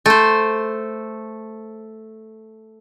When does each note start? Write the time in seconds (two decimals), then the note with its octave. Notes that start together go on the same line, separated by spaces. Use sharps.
0.06 A3 C5